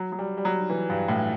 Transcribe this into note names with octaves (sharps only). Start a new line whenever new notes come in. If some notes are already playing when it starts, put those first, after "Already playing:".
Already playing: F#3
F#3
G3
G3
F#3
E3
G2
A2